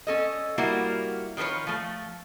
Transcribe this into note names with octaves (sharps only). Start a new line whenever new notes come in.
C#4 A4 D#5
G3 A#3 E4 F#4 A#4
D#3 F3 A4 B4 C#5
F3 A3